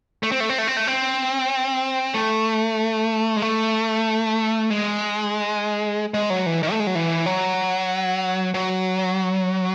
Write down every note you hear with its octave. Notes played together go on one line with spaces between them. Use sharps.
A3
C4
A3
C4
A3
C4
A3
C4
A3
G#3
A3
G#3
G#3
F#3
E3
D#3
A3
G#3
F#3
E3
F#3
F#3